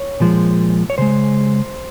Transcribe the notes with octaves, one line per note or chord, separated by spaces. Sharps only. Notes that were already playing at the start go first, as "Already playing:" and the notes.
Already playing: C#5
A#2 F3 G#3
C#5
C#3 G#3 C5